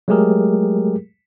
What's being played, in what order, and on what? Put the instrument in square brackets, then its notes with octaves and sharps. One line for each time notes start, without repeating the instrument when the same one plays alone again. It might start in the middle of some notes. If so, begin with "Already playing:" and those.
[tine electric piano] F#3 G#3 A3 G4 G#4 A#4